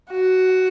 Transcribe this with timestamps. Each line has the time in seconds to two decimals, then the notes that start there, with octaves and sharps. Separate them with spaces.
0.11 F#4